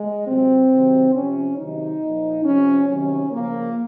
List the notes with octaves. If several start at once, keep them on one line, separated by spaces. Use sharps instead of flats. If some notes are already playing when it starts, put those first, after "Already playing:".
Already playing: G#3
C3 F#3 C4
C3 D#3 F#3
C3 F3 C#4
C3 D#3 F#3 D#4
A#2 F3
C3 F3 C#4
C3 D#3 F#3 C#4
C#3 F3 A#3